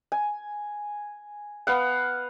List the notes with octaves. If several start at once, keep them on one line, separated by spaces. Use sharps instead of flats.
G#5
B3 F5 F#5